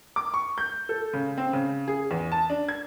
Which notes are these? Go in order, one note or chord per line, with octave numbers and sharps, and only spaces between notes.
D6
C#6
G6
A4
C#3
C4
C#3
G#4
E2
A5
D4
G#6